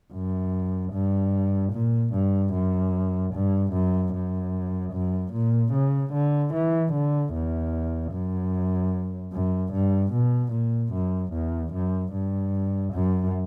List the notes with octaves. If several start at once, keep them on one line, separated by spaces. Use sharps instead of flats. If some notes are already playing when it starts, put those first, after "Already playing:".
F#2
G2
A#2
G2
F#2
G2
F#2
F#2
F#2
A#2
C#3
D3
E3
D3
E2
F#2
F#2
G2
B2
A#2
F#2
E2
F#2
G2
F#2